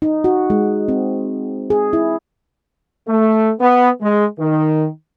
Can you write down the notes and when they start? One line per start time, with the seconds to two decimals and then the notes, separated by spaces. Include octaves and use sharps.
0.02 D#4
0.24 F#4
0.50 G#3
0.88 C4
1.70 G#4
1.93 E4
3.08 A3
3.61 B3
4.01 G#3
4.38 D#3